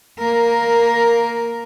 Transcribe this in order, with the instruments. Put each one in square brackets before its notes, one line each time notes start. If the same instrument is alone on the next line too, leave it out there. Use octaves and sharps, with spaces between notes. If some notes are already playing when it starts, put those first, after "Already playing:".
[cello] A#3 A#4